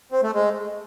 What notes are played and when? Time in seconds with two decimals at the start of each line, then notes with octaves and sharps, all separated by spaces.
0.12 C4
0.23 A3
0.35 G#3